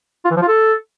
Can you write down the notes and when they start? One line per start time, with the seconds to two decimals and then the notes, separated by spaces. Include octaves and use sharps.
0.25 F4
0.30 E3
0.36 F3
0.42 F4
0.48 A4